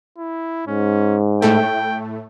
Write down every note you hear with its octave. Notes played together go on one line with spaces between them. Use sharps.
E4
G#2 C#4
A2 A3 G5